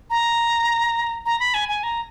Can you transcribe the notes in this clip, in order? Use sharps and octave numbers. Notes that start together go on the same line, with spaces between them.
A#5
A#5
B5
G#5
G#5
A#5